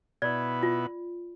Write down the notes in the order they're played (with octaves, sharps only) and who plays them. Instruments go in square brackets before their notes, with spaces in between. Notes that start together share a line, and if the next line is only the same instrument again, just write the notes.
[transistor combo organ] B2 B3 E4 [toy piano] D5
[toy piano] F4